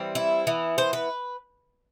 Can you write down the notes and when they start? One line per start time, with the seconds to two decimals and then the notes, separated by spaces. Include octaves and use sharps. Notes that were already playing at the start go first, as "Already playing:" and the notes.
Already playing: E3 G3 C4
0.15 E4
0.47 E3 B3
0.78 C5
0.93 B4